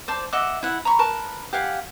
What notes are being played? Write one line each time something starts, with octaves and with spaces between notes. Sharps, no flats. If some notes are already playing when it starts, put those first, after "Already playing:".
C5 D5 A5
D#5 E5 F#5 D6
E4 F#5
A#5 B5 C#6
A#4 B4 A5
G4 F5 F#5 G#5